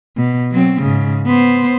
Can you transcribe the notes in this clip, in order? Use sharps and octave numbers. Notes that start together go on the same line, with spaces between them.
B2
F#3 C4
G#2 C#3
B3 C5